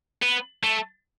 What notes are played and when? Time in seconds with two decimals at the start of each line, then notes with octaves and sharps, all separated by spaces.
0.22 B3
0.64 A3